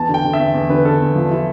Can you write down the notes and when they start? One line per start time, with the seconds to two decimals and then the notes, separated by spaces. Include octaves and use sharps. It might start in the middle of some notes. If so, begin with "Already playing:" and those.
Already playing: E2 A5
0.09 D3
0.14 G5
0.24 D3
0.33 E5
0.39 E2
0.54 E2
0.70 D3 B4
0.85 D3 A4
1.01 E2
1.16 F3
1.31 E4